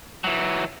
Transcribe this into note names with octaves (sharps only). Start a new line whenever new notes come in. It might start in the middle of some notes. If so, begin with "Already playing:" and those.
E3 F#3